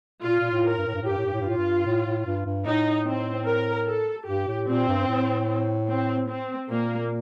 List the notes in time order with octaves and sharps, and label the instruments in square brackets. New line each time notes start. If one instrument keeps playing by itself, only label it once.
[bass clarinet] A#2 [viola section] F4
[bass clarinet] A#2
A2
[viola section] A#4
[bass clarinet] G2
A2
G2
[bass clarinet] A2 [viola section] G4
[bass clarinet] G2
A2
G2
A2
G2
[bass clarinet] A2 [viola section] F4
[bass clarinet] G2
A2
A2
G2
G2
[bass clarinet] A2 [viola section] D#4
[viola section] C4
A#4
A4
[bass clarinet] G2 [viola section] G4
[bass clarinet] A2
[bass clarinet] A#2 [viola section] C4
[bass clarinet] G2
A2
[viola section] C4
C4
[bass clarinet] A#2 [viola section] A#3